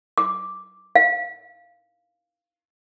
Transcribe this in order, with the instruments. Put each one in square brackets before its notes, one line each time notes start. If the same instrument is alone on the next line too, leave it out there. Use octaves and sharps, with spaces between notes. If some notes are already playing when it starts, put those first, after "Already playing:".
[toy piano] D6
F5